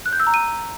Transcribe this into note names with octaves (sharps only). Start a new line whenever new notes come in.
F#6
G6
E6
A#5
D#7